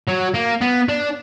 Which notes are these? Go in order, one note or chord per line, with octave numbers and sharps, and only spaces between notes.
F#3
A#3
B3
D4